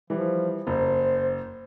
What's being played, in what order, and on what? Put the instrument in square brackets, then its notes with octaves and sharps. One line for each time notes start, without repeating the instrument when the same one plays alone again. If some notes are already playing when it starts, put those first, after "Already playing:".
[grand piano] E3 G3 [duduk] F3
[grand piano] F#1 [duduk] C5